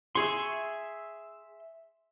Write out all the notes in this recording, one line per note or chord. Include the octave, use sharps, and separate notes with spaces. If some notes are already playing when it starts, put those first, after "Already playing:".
G#4 E5 C6 C#6